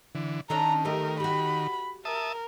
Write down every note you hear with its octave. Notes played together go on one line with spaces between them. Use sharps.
D3 E3
D#3 C#4 D4 A4 A#5
A3 G4 A#4 D#5
F#4 G4 B5
A#4 E5 A5 D#6